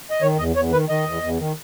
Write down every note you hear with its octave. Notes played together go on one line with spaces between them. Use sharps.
D#5
D#3 C#5
E2 D#5
E2 C#5
D#3 B4
D#3 D#5
E2
E2
D#3